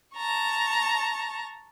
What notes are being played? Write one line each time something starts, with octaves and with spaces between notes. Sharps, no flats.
A5 A#5 C#6